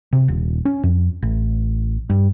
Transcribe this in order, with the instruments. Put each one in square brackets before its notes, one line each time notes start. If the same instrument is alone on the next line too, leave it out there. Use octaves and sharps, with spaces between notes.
[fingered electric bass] C3
D#1
C#4
F2
A1
G2